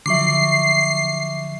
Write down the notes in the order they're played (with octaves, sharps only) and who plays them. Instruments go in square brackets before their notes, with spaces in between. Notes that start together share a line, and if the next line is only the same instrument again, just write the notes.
[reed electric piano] D3 F3 F#3 [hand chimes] E5 C#6 D6 [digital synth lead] C7